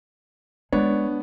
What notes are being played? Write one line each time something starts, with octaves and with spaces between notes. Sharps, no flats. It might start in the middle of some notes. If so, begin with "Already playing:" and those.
G#3 B3 D4 C#5 D5